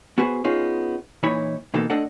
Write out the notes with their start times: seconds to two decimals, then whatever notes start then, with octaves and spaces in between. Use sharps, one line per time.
0.18 B3 F#4 G#4 B4 C5
0.44 B3 C#4 D#4 F4 G#4
1.23 A#2 E3 D#4 E4 C#5 B5
1.74 B2 E3 A#3 D#4 A4
1.90 A3 D4 A4 D5 D#5 F#5